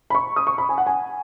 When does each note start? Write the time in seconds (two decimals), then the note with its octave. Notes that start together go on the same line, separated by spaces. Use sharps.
0.10 B5
0.15 C#6
0.36 D#6
0.47 C#6
0.58 B5
0.69 G#5
0.78 F#5
0.86 G#5